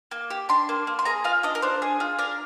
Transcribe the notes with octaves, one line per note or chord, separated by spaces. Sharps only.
A#3
G4
D4 C6
A#3
A#3
C6
G#4 A#5
F4 F5
D4 D#5
A#4
D4 C5
G#4
F4
D4 A#4